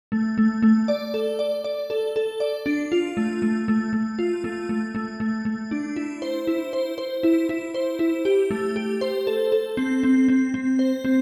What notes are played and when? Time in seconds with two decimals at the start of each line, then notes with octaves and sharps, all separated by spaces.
0.12 A3
0.38 A3
0.62 A3
0.88 D5
1.14 A4
1.39 D5
1.64 D5
1.90 A4
2.16 A4
2.40 D5
2.66 D4
2.92 F4
3.17 A3
3.42 A3
3.68 A3
3.93 A3
4.19 F4
4.44 A3
4.69 A3
4.95 A3
5.20 A3
5.45 A3
5.71 D4
5.96 E4
6.22 C5
6.47 E4
6.73 C5
6.98 C5
7.23 E4
7.49 E4
7.74 C5
7.99 E4
8.25 G4
8.51 A3
8.76 G4
9.01 C5
9.27 A4
9.52 A4
9.77 C4
10.03 C4
10.28 C4
10.54 C4
10.79 C5
11.05 C4